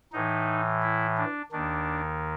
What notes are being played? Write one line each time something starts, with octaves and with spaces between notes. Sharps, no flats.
A2 E3 D#4
E4
D4
D#2 D#3 D4